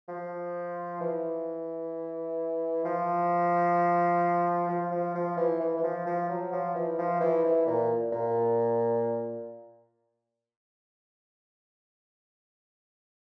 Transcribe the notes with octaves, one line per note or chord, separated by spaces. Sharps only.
F3
E3
F3
F3
F3
F3
E3
E3
E3
F3
F3
F#3
F3
E3
F3
E3
E3
A#2
A#2